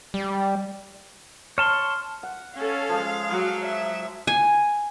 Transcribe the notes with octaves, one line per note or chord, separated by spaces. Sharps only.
G3
C#5 A5 C6 F6
F#5
C#4 A4 F5
F3 G#3
F#3
E5
G#5